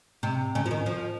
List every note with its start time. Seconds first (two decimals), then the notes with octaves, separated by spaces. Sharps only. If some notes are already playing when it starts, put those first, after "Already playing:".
0.23 C3
0.55 C#3
0.66 F3
0.71 D#3
0.86 F3